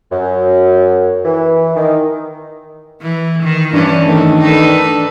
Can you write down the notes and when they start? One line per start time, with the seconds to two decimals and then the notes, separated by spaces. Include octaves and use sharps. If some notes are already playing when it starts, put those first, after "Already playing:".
0.12 F#2
1.25 E3
1.76 D#3
3.02 E3
3.43 D#3
3.73 G2 E3 C#4 D4
4.05 D#3 A3
4.42 D#4 A4 B4